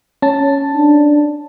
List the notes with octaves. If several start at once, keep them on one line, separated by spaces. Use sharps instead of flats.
C#4 A5
D4